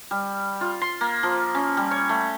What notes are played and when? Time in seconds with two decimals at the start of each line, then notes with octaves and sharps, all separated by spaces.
0.11 G3
0.61 F4
0.82 C6
1.01 A#3
1.23 F3
1.55 C#4
1.77 G3
1.91 C#5
2.09 A3